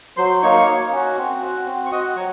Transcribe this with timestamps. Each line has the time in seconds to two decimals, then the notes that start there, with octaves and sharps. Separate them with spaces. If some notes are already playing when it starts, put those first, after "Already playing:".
0.17 F#3 C5 C6
0.43 A#3 D#4 C#5 C#6
0.67 A#3
0.92 C#4 F#4
1.17 C4
1.42 F#4
1.66 C4
1.86 C#6
1.91 F#4 D#5 D#6
2.16 F#3 C#5 C#6